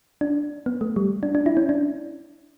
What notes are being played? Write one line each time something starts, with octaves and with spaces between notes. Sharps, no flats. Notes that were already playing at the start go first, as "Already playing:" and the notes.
D4
B3
A3
G3
D4
D4
E4
C#4
D4